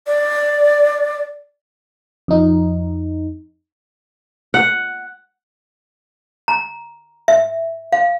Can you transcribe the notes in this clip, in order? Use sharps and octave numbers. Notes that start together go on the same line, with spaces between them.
D5
F2 D#4
F#5
A#5
E5
F5